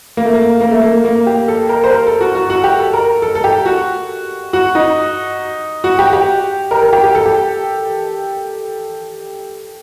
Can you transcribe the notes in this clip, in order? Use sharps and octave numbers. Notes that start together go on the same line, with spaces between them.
A#3
A3
A#3
A#3
A3
A#3
A#3
G4
A4
A#4
C5
A#4
A4
F#4
F#4
F#4
G4
A4
A#4
A4
A4
G4
F#4
F#4
D#4
F#4
G4
G4
A#4
A#4
G4
G4
A4
G4